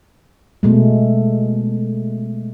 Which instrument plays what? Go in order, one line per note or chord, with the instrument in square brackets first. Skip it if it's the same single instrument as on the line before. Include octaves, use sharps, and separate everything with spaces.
[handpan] B2 G#3 A3